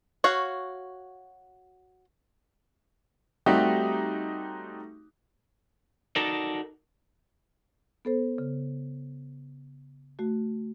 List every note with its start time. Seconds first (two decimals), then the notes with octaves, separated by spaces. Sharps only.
0.24 F#4 C#5 F5
3.46 G3 A3 C4 D#4 F#4 G4
6.16 D#4 F#4 A4 A#4 D5
8.05 B3 A4 C5
8.38 C#3
10.19 A3 F#4